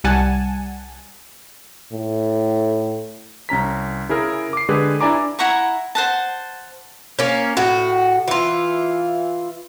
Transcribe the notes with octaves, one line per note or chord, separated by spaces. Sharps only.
C2 G3 F#5 G#5 A5
A2
C2 C#4 A#5 B6
C#3 E4 G#4 A#4
D6 C7
D3 G#3 G4 G#4 B4
D4 E4 D5 G#5 A#5 D6
E4 F#5 A#5 C#6
C5 F#5 A5
A#3 C#4
A2 F#4
E3 F4